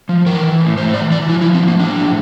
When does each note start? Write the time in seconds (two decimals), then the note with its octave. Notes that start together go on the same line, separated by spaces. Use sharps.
0.09 F3
0.26 E3 A#4
0.43 E3
0.60 A2
0.78 A2 C5
0.94 E3 D5
1.12 E3 D5
1.28 F3 E4
1.41 E4
1.46 F3
1.55 C4
1.63 A2
1.67 A#3
1.79 A2 D4
1.97 F3